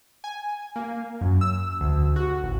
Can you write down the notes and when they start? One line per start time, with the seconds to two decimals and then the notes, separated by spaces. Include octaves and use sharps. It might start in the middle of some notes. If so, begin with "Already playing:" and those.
0.24 G#5
0.76 A#3
1.21 F#2
1.41 E6
1.81 D2
2.16 F#4
2.43 A1